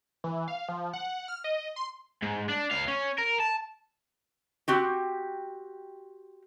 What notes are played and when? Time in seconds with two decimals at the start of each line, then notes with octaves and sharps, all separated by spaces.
0.24 E3
0.48 F5
0.69 F3
0.93 F#5
1.28 F6
1.44 D#5
1.76 C6
2.22 G#2
2.49 D4
2.71 C#2 F5
2.88 C#4
3.18 A#4
3.40 A5
4.68 C4 F#4 G4